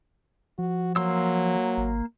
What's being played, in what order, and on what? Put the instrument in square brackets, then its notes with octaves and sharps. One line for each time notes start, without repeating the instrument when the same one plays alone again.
[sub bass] F3 [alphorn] F#4
[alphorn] F#3 [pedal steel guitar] A#3 C6 E6
[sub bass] G#1